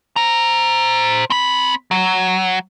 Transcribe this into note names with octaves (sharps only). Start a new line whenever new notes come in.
C5 A#5
C4 B5
F#3